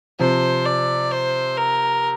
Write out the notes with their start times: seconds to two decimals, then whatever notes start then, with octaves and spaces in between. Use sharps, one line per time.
0.19 C3 F3 C5
0.65 D5
1.11 C5
1.57 A#4